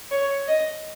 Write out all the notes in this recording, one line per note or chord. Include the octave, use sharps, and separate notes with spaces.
C#5
D#5